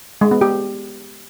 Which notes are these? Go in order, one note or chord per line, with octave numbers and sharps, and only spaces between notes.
G#3
B3
G4